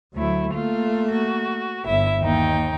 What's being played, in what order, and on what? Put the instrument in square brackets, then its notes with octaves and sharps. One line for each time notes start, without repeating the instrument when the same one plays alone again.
[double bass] D2 F#3 [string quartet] A3 E4
[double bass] A3 A#3 [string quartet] F4
[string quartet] F#4
[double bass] G1 [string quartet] E4 E5
[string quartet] D#2 D#4 G5 [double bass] A#3